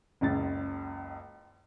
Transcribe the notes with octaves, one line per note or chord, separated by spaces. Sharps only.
F#1 C#2 A6